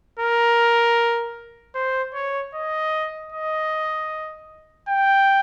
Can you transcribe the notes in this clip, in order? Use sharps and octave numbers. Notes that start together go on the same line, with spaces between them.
A#4
C5
C#5
D#5
D#5
G5